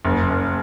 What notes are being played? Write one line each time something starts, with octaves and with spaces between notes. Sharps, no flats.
F#1
F#1